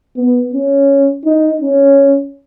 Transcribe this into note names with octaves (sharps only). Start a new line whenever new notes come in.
B3
C#4
D#4
C#4